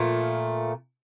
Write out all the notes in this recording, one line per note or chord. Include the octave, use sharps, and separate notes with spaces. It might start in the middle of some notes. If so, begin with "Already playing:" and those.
Already playing: A#2 F3 A3